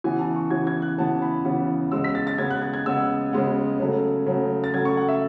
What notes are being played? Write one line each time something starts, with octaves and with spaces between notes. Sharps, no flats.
C#3 E3 B3 G#5
A5
C#6
C#3 E3 B3 G#6
G#6
F#6
C#3 E3 B3 A5
B5
C#3 E3 B3
C#3 G#3 B3 E6
B6
A6
A6
C#3 G#3 B3 G#6
F#6
A6
G#6
C#3 G#3 B3 E6
C#3 G#3 B3
C#3 F#3 A3
C#3 F#3 A3
A6
C#3 F#3 A3 G#6
C#6
F#5
E5